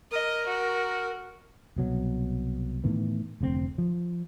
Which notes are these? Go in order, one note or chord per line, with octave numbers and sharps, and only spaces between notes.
A#4 D#5
F#4
C2 B2 F#3
A2 D#3 E3 B3
F1 D2 B2 C4
F3